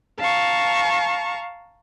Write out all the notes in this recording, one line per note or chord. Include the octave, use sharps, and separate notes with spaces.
F5 A5 A#5 C#6